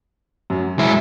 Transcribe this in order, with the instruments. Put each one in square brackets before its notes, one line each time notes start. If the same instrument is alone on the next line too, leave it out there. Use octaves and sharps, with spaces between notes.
[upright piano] F#2 F#3
[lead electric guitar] G#3 E4